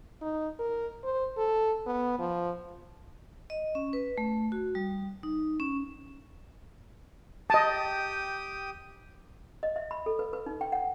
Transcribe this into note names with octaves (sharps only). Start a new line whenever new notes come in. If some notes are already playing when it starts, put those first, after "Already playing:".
D#4
A#4
C5
A4
B3
F3
D#5
C#4
B4
A3
F#4
G3
D#4
C#4
G4 D#5 G5 A5 D#6
D#5
E5
B5
A4
B4
B4
D#4
G5
F#5